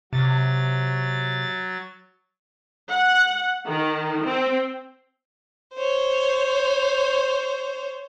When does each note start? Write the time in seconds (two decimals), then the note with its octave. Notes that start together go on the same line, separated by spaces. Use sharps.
0.13 C3 F#3 A6
2.90 F#5
3.66 D#3
4.25 C4
5.74 C5 C#5